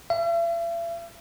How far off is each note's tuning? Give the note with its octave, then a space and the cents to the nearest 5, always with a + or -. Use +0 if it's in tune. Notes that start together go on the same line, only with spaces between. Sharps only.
E5 +45